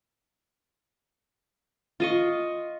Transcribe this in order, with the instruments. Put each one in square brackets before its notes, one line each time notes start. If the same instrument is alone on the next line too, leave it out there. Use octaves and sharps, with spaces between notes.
[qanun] F4 D#5 C#6